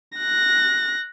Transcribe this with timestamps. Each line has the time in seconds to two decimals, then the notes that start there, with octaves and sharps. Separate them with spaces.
0.18 F#6 A#6